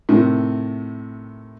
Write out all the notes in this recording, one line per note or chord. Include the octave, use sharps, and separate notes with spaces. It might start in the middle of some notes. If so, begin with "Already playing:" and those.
A2 C3 D#3